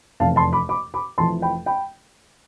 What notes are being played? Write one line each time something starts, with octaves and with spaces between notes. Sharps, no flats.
F1 E2 C3 F5 A5
A5 C6
B5 D6
B5 D6
B5 D6
F1 F2 E3 A5 C6
G5 B5
G5 B5